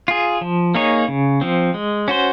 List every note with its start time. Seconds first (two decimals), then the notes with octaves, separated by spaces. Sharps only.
0.08 F4 G#4
0.41 F3
0.75 A#3 D#4 G#4 C#5
1.08 C#3
1.41 F3 C4
1.74 G#3
2.08 C#4 F#4 C5